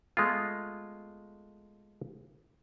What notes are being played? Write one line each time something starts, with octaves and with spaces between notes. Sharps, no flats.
G#3 A3 B3 F4